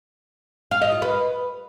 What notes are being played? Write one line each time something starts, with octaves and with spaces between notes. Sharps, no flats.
F5
D#5
F4
B4